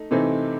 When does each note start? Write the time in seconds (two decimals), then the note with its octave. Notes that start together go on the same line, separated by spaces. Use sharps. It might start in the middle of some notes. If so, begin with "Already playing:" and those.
Already playing: A3 D#4
0.11 C3 E3 A3 C4 D#4